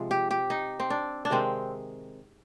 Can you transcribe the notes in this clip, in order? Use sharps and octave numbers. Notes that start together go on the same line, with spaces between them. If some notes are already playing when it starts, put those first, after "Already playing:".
Already playing: C3 F3 G#3
G4
G4
D#4
C4
D4
D4
C3 D#3 G#3 C4